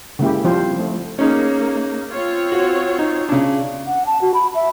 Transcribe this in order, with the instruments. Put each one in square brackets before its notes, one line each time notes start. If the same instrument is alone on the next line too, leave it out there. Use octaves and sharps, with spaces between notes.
[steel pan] C#3 G#3 A#3 E4 G4
F3 G3 C4 F4 G4 C5
A3
[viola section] A#3 [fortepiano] C#4 D#4 G#4
[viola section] C4 F4 C#5
[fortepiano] F#4
D#4
C#3 D4
[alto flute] F#5
A5
F#4
B5
E5